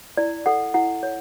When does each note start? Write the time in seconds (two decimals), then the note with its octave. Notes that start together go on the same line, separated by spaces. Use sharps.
0.17 E4 D5
0.46 A4 F#5
0.74 E4 F#5
1.03 C#5